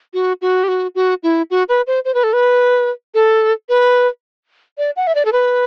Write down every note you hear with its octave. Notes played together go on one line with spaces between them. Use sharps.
F#4
F#4
G4
F#4
F#4
E4
F#4
B4
C5
C5
B4
A4
B4
A4
B4
D5
F#5
E5
D5
A4
B4